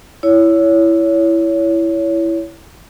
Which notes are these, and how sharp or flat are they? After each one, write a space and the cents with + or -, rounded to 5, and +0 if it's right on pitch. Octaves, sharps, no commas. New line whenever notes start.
E4 +10 C#5 +20